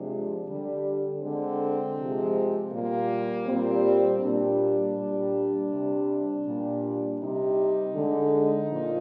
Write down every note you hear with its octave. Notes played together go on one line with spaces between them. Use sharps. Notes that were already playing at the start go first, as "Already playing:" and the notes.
Already playing: C3 F3 G#3 D4
D3 G3
D3 G#3 C4
C3 F3 G#3
A#2 G3 A#3
A#2 G3 C4
A#2 G3 D4
A#2 G3
C3 G3
A#2 G3
C3 G3 D#4
D3 G#3
A#2 F3